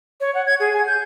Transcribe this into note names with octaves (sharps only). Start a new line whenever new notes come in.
C#5
F#5
G#6
G#4
G#5
G6